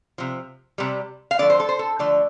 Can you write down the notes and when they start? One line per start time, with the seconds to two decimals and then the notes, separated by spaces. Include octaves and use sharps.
0.18 C3 F3
0.78 C3 G3
1.31 F5
1.39 D3 F3 A3 D5
1.50 C5
1.60 A4
1.69 C5
1.79 A4
1.99 D3 F3 A3 D5